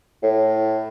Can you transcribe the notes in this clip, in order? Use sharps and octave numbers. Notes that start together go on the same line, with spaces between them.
A2